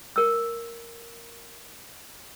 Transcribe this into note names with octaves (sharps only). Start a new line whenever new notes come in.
A#4 E6